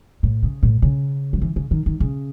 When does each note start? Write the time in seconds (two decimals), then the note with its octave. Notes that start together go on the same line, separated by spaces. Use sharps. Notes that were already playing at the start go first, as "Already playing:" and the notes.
0.23 A2
0.43 C#3
0.63 A2
0.82 C#3
1.33 F#3
1.42 E3
1.56 C#3
1.71 D#3
1.86 D#3
2.00 C#3